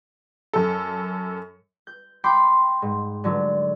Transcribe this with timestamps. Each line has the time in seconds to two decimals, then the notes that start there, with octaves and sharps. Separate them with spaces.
0.53 F#2 A4
1.87 G6
2.24 G5 B5 C6 D6 G6
2.82 G#2
3.24 D3 F#3 D4